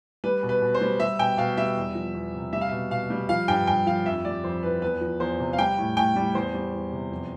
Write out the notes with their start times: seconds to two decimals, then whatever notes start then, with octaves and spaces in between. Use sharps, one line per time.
0.24 G3 B4
0.43 B2
0.49 B4
0.62 B2
0.74 C5
0.81 G3
1.00 G3 E5
1.19 B2 G5
1.38 B2 F5
1.57 G3 E5
1.77 E2
1.95 F3
2.15 E2
2.34 C3
2.53 G3 E5
2.61 F5
2.69 B2 E5
2.91 B2 F5
3.10 G3
3.29 F3 F5
3.48 G2 G5
3.67 G2 G5
3.86 F3 F5
4.06 F2 E5
4.25 G3 D5
4.44 F2 C5
4.63 E3 B4
4.82 E2 B4
5.01 F3
5.20 E2 C5
5.39 C3
5.53 F5
5.59 G3 G5
5.78 A2
5.97 A2 G5
6.16 G3
6.35 E2 C5
6.54 G3
6.73 E2
6.92 C3
7.11 F2